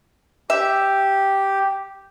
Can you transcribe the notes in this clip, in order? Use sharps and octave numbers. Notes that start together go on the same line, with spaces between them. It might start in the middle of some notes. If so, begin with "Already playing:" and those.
G4 E5